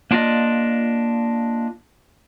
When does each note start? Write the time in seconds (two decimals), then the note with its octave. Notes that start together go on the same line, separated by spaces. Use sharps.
0.11 A#3 D4 F4 D5 D#5